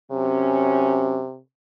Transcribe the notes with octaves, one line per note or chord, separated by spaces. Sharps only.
F#2 C3 C#4